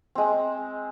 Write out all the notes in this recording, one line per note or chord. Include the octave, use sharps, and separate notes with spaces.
G#3 C4